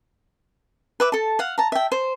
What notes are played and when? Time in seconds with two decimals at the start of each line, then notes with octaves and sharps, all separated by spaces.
1.00 B4 E5 D6
1.12 A4 A5
1.39 F5 F#5
1.58 A5 A#5
1.72 E5 G5
1.92 C5